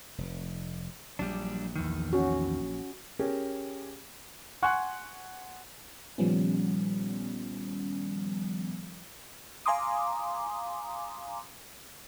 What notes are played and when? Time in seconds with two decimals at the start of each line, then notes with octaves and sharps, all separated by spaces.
0.18 F1
1.19 A#1 F#3 G3 D4
1.76 E2 D#3
2.13 C#4 F#4
3.19 C#4 G4 G#4 A#4
4.63 F#5 G#5 C6 C#6 F#6
6.18 A#2 D#3 F3 G3 B3 C#4
9.66 F5 G#5 A#5 C6 D6 D#6